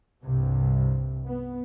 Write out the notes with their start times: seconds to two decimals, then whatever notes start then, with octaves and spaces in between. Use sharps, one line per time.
0.23 C2 G2 C3
1.26 B3